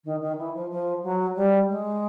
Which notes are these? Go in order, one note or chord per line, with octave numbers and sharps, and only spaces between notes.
D#3
D#3
E3
F3
F3
F#3
G3
G#3